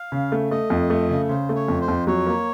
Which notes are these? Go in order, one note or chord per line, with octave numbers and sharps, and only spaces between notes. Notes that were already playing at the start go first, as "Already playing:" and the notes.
Already playing: F5
C#3
A3
A3 D#5
F2
A3
C#3
C#3 C5
A3
C#5
F2
C5
F2
F#3 C#5
A#3